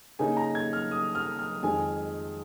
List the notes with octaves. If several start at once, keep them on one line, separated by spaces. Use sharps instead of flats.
C#3 A#3 D#4 G#5
A#5
G#6
F6
D#6
F6
F6
F2 D#3 G#3 G#5